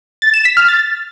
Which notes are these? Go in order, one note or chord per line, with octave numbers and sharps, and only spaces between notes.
A6
E7
B6
F6
A6